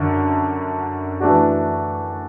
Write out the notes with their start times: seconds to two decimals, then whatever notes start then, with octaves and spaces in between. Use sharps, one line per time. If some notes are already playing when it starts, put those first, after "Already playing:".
Already playing: F#2 D3
1.20 E3 A3 D4 F#4